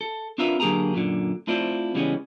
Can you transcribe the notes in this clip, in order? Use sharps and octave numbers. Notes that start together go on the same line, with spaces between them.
A4
C4 D4 F4 A#4 B4 E5
D3 F#3 A#3 G4 G#4 A#5
F#2 A#2 D3
A3 C4 E4 F4 C5 D5
C#3 E3 G3 G#3 B3 C#4